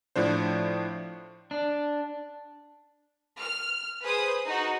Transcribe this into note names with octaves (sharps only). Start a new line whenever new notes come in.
A2 F3 D4 C5
D4
F6
G#4 B4 C5 D#6
D#4 F#4